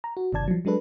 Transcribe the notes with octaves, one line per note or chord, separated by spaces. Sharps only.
A#5
F#4
G1 C3 D#3 D5 A5 G#6
F3 F#3
F#3 G#3 D4 A4 B4